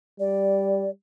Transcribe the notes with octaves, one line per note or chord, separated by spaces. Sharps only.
G3 D5